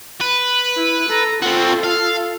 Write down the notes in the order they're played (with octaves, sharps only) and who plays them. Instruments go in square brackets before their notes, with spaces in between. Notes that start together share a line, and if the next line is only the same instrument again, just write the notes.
[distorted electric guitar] B4
[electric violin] E4
A4 A#5
[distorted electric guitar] C4 F#4 [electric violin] F4 A4
[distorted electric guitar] F5